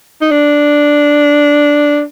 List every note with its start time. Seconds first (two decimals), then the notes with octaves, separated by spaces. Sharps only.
0.21 D#4
0.31 D4